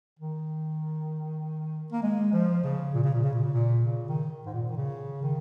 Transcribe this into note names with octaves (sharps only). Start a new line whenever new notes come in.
D#3
A#3
G#3
F3
C#3
A#2
C#3
A#2
C#3
A#2
C#3
A#2
C#3
D#3
G#2
A#2
D#3
C#3
D#3